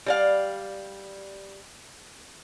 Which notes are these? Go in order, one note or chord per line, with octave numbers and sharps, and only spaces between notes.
G3 D5 F5